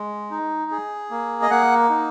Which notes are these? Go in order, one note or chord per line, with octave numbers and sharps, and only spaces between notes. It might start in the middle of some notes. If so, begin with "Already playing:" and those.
Already playing: G#3
D#4
G#4
A#3
D#5
A#3 F#5
D#4